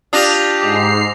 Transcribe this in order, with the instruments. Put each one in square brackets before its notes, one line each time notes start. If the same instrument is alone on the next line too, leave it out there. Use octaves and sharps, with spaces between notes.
[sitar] D4 F4 [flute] G4 [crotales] D#6 A#6 F7
[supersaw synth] G#2 C7 [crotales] D6